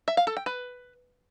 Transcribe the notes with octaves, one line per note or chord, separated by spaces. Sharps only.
E5
F5
A4
G5
B4